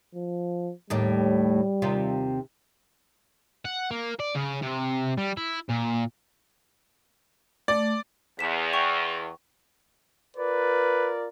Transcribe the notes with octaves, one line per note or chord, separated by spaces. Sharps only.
F3
D#2 A2 G3 D5
D#2 C3 F4
F#5
A#3
D5
C#3
C3
G3
E4
A#2
A3 D5
E2 B6 E7
G5 C#6 F7
F4 A#4 B4 D5